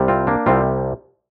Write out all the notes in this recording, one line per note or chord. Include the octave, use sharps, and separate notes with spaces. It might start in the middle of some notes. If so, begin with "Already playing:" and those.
Already playing: C2 C3 G3
C4 F4
A#3 D4
C2 C3 G3 C4 F4